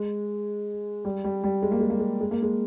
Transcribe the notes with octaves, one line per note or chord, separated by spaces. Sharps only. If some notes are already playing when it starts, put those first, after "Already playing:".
Already playing: G#3
G3
G3
G3
G#3
A#3
G#3
A#3
G#3
G#3
A#3
G#3